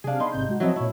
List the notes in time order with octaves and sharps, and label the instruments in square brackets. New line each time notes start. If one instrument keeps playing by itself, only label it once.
[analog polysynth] C3 F5 [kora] D4 G#4
[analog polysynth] B3 B5 C6 [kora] D#4
[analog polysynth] G#1 C3 G6
G#3 F#4
[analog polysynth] F3 C4 D#5 [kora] F#3 A3 E4
[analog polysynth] A#2 C#5 [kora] E4